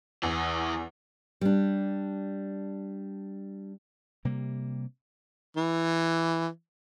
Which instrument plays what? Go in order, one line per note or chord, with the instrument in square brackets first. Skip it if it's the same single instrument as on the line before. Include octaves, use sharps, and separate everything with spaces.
[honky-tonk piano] E2 [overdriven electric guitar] E3 G#4
[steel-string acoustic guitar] G3 D4
[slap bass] C3 G3 A#3
[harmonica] E3